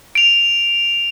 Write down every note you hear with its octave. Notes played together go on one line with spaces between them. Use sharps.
D7 F7